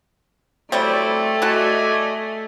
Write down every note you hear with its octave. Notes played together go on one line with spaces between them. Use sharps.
F#3 G3 A3 C4 E4 D5
F#4 D5 D#5 G#5 A5